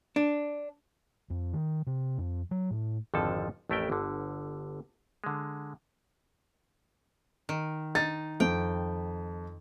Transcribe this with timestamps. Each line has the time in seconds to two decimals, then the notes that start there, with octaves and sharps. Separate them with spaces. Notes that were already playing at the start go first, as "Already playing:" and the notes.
0.16 D4
1.30 F2
1.53 D#3
1.87 C3
2.18 F2
2.51 F#3
2.71 A2
3.14 G#1 F2 D3 F3 A4 A5
3.69 A1 F2 A3 E4 A#4 G5
3.90 G1 D3
5.24 D3 G#3
7.49 D#3
7.95 D#4 A6
8.40 F2 G5